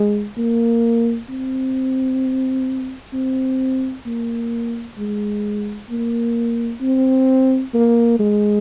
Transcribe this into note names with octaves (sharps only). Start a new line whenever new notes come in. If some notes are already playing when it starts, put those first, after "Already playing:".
Already playing: G#3
A#3
C4
C4
A#3
G#3
A#3
C4
A#3
G#3